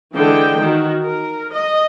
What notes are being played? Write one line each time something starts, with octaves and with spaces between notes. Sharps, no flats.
D3 E3 G#3 G5
D#3 F#4
A#4
D#5